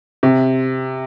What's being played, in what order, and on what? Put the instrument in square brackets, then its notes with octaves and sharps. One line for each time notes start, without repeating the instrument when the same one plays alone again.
[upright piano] C3